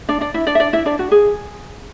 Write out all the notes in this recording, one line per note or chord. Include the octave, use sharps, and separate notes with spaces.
D4 D5
D4 D5
E4 E5
D4 D5
E5
D4 D5
E4 E5
D4 D5
F#4
G#4